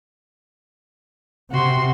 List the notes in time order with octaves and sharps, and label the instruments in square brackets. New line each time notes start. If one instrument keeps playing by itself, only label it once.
[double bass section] C3 [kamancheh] F#4 C6